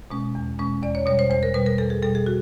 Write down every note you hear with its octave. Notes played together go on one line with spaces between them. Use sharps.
B2 G#3 C#4
E2
B2 G#3 C#4
E2 D5
C#5
B2 G3 C#5
C5
E2 C5
A#4
B2 G3 B4
A#4
E2 A4
G#4
B2 G3 A4
G#4
F#4